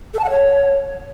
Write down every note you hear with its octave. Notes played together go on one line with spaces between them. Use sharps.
A4
A5
F#5
C#5